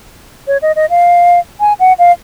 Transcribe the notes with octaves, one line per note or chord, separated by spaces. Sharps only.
C#5
D#5
D#5
F5
G#5
F#5
F5